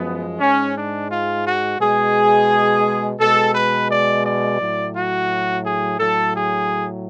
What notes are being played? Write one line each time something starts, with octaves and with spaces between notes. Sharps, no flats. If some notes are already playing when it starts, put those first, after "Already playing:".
Already playing: F#2 F3 G#3 B3
G#2 G#3 C#4
D4
F4
F#4
B2 G#3 G#4
B2 G#3 A4
B4
D5
D5
A2 F#3
F#4
G#4
A2 F#3 A4
G#4